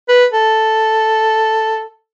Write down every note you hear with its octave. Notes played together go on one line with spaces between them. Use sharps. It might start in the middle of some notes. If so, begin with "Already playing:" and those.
B4
A4